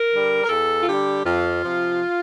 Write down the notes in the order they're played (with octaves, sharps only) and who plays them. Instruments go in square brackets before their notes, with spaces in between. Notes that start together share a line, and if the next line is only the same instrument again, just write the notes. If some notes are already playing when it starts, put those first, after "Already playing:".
Already playing: [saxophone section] A#4
D3 G3
A#4
E2 A4
F4
D3 G3 G4
F2 F4
C3 F3